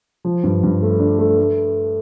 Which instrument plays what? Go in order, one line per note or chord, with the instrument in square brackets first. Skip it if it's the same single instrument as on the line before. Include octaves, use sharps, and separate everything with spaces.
[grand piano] F3
G2
G2
A3
D4
A3
A3